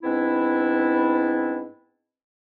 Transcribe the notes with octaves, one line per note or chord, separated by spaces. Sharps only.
G#2 B3 C4 D4 E4